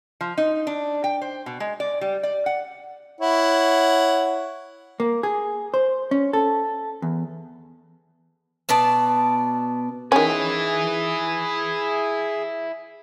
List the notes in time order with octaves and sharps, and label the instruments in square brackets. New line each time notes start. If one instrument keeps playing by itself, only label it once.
[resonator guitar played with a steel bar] F3
D#4
D4
G5
C5
B2
G#3
D5
G3
D5
F#5
[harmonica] E4 C#5 F#5
[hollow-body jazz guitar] A#3
G#4
C5
C#4
A4
E2
[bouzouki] B2 B3 D5 A5
[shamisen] D#3 C#4 [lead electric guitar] E4 B4 [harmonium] G#4